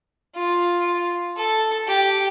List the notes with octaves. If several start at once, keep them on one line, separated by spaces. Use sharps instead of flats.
F4
A4
G4